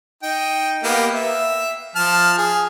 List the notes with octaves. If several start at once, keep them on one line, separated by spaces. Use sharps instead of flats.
D#4 G5
A#3 B3 G4
E5
F3 A5 F6
G#4